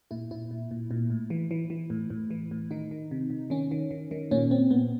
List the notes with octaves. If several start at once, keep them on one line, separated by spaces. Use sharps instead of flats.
A#2 E4
A#2 E4
A#2
A#2
A#2
A2
E3
E3
E3
A2
A2
E3
A2
D#3 D#4
D#3
C3
C3
D#3 C#4
D#3
D#3
D#3
A#2 C#4
A#2 C4
A#2 B3